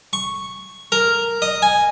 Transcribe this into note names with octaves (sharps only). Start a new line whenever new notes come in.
C#6
A#4
D#5
G#5